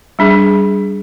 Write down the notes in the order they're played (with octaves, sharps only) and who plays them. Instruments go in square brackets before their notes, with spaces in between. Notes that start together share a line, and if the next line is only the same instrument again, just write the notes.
[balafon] G3 D4 G#4